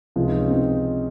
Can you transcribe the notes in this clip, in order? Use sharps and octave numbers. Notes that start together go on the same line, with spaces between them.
C#2 C3 F3 G#3 F4
D#4
C#4
C4 D#4